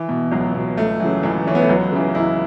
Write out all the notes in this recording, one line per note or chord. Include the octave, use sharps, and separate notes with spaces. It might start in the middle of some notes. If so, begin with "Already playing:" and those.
Already playing: E3
B2
C#2 F#3
B2
C#2 A3
C#3 E3 F#3
C#2 E3
C#3 E3 C#4
B3
A3
C#2 F#3
C#3 E3
C#2 E4